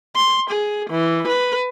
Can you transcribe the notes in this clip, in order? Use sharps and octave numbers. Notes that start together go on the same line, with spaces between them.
C6
G#4
E3
B4